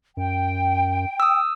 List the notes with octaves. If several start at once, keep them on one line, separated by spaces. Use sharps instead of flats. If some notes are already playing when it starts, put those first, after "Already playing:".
F#2 G5
D#6 E6